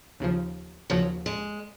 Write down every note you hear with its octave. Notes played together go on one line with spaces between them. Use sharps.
D#2 C#3 F3
D#2 C#3 F3 F#3
G#3